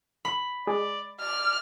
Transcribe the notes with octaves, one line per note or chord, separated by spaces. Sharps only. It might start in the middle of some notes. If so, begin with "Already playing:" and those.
B5
G#3 D5
D5 F6